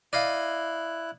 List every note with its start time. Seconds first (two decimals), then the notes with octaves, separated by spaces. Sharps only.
0.13 E4 D5 D#5 F5 F#6